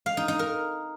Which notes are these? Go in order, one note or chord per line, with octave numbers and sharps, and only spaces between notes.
F5
D#4
D#4
A#4